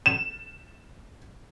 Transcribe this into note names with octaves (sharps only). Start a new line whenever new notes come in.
E7